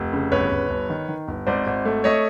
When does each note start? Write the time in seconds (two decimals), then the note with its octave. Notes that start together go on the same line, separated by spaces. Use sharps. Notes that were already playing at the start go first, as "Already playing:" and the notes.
Already playing: F1
0.13 C#3
0.32 G1 B4 C#5
0.51 G1
0.70 G1
0.90 D#3
1.09 D#3
1.28 G1
1.47 G#1 C5 D5
1.67 G#1
1.85 A3
2.04 A3 C#5 D#5